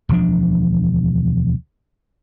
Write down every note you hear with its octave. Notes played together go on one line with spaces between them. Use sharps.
E1 D2 F3 D4